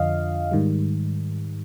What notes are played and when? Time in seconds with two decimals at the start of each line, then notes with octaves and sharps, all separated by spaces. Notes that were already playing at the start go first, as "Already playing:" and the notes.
Already playing: F2 D3 F3 D#5 F5
0.51 G#2 D#3 G3